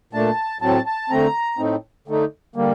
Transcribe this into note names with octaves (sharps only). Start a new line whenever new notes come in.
A#2 A3 D4 A5
A2 F#3 C4 A5
A5
D3 A3 C4 A#5
A2 A3 C4 D#4
D3 A3 D#4
D3 G3 A#3